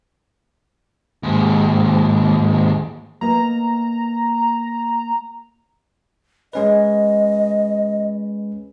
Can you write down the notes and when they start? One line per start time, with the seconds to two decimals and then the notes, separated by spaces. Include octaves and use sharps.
1.23 D#2 G#2
3.21 A#3 B3 D#5 A#5
6.53 G#3 C#4 B4 D#5